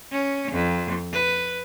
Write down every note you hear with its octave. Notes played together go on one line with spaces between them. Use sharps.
C#4
F2
B4